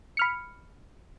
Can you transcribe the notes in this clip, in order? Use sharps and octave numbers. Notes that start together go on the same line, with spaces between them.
B5 F6 C#7